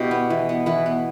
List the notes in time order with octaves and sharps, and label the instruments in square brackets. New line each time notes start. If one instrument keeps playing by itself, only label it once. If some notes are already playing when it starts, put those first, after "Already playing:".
Already playing: [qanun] B2 A3 D4 E4 G4
B3
E3
B3
E3 B4
B3